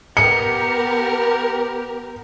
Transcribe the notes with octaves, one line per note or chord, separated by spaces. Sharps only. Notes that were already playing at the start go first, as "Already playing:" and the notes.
B3 G4 A#4 C#7